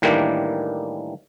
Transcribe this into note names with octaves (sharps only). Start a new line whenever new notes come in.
A2 D#3 E3 G3 A#3 D4